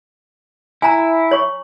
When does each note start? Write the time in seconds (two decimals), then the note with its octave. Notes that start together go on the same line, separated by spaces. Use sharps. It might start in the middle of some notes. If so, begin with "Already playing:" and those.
0.82 E4 G#5 A#5
1.31 C#5 C#6